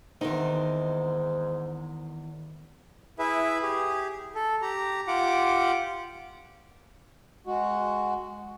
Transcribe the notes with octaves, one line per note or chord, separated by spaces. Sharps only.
E2 G#2 D#3 C4 D#4
E4 G#4 B4 E5
G4 G#4
A4
G4 A#5
F4 G4 F#5 D6
G#3 F#4